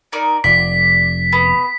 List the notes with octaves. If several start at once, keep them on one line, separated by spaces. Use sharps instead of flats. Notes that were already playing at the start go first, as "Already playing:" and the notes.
D#4 A#4 D5
F1 D5 B6
B3